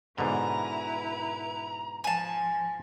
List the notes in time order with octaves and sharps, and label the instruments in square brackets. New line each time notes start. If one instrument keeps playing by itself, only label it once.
[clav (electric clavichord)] G#2 B2 D3 [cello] E4 B4 [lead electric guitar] A#5
[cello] F3 [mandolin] G#5 A5